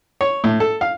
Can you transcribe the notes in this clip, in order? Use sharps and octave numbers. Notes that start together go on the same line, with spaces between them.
C#5
A2
A4
F5